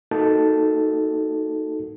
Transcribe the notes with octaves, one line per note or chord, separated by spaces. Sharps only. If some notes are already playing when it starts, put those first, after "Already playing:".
A#3 D#4 F#4 A4 A5